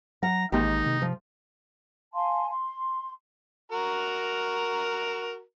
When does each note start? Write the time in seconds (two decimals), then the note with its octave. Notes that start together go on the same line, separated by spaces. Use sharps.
0.23 F#3 F#5 A#5
0.52 A1 D#2 G#2 D#3 D#4 G4
0.86 C3
1.02 F3
2.14 F5 G#5 A5 C6
2.49 C6
3.72 F#4 A#4 A#5